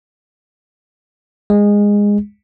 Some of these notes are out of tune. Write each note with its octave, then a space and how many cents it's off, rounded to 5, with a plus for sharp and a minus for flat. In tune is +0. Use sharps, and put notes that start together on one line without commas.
G#3 -15